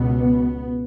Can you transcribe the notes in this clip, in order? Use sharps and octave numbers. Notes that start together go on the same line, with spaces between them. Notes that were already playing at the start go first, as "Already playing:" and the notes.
Already playing: C#2 B2 B3